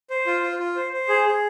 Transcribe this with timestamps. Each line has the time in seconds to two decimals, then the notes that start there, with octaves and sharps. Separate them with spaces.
0.10 C5
0.27 F4
0.43 F4
0.59 F4
0.76 C5
0.93 C5
1.09 G#4
1.25 G#4